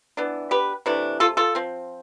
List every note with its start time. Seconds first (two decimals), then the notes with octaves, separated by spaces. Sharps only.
0.17 E3 B3 D4
0.51 G4 B4
0.86 C3 E3 A3 D4
1.20 F4 A4
1.37 F4 A4
1.55 F3 C4